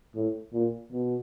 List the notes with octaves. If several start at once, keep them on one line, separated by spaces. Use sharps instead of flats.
A2
A#2
B2